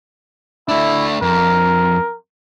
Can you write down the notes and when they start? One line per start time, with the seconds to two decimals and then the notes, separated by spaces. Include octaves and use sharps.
0.69 A3 D4 E4
1.22 F2 A#4